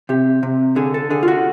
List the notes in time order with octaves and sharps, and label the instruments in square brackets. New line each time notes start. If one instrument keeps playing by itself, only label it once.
[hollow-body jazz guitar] C3 G4
C3
D3 G#4
A4
D3 G#4
F4
F#4